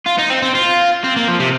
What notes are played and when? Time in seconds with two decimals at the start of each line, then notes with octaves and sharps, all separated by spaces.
0.06 F4
0.19 D#4
0.30 C4
0.42 C4
0.55 F4
1.04 C4
1.16 A#3
1.28 F3
1.40 C3